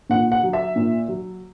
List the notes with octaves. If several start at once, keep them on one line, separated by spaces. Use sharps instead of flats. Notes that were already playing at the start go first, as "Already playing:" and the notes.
A#2 F#5
F#5
F#3
E5
A#2
F#3